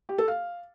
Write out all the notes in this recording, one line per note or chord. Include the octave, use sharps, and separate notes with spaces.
G4
A4
F5